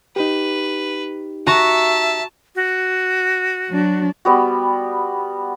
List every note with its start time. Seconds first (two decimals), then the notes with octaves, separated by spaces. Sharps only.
0.16 D#4 G4 B4
1.47 F#4 E5 A5 A#5 C#6
2.55 F#4
3.69 F#3 D4
4.25 G3 B3 F#4